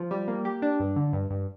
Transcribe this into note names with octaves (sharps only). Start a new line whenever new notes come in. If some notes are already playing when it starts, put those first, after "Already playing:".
Already playing: F3
G3
A#3
G4
D4
G2
D3
G2
G2